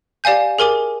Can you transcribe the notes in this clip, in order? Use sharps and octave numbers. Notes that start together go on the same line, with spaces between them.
G4 D5 F5 G#5 G6
G#4 A#4 G#5 D6